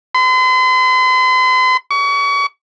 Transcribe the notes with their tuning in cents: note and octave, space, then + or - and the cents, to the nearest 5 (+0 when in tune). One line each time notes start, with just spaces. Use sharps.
C6 -45
C#6 +35